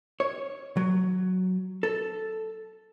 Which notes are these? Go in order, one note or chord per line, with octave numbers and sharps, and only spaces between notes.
C#5
F#3
A4